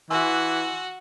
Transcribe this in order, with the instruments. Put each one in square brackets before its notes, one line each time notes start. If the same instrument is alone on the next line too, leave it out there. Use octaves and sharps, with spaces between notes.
[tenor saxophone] E3 [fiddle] F#4 [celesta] G#5 C6 E6